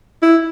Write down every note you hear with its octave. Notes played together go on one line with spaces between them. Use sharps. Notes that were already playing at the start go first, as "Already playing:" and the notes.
E4